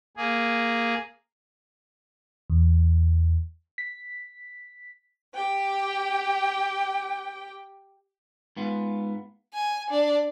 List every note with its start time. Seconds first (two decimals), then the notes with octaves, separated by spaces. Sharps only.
0.17 A#3 G#4
2.50 E2
3.78 B6
5.34 G4 G5
8.57 G#2 B3 F4
9.54 G#5
9.90 D4